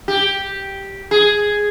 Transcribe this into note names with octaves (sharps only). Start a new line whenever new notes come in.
G4
G#4